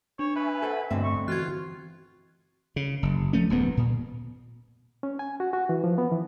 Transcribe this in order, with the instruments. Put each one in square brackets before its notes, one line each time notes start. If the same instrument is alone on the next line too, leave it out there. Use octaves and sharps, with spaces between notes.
[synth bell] D4 [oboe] C#5
[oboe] B4 [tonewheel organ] E5 G#5
[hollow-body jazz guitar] A4 C5 F#5
[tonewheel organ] G2 A3 E5 [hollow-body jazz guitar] B2 D3 C4
[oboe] C#6
[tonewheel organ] E3 F#4 [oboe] F4 [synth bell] F#6 G#6
[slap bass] C#3
F#1
F3 A3 C#4
D#1 F2 G#2 B3
A#2
[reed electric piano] C#4
G#5
F#4
F#4
E3
F3
B3
E3